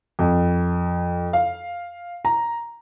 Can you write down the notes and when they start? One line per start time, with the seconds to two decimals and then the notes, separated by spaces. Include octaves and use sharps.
0.19 F2
1.33 F5
2.25 A#5